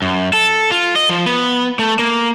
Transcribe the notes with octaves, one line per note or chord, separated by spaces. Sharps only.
F#2
A4
F4
D#5
F3
B3
A3
A#3